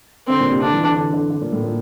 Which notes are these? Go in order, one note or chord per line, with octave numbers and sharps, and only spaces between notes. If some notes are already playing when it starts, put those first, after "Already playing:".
D3 C4
A#2
C3
D3 D4
E3
D3
D3
D3
D3
A#2
A2
A#2